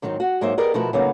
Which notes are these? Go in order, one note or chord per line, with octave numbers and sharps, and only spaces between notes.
G#2 D#3 F#3 C4 D#4
F#4 F#5
G#2 F#3 A#3 D#4 C5 E5
B3 G4 G#4 A#4 D5 D#5
B2 F3 A3 E4 F#4 A#4
C#3 F#3 A#3 B3 D#4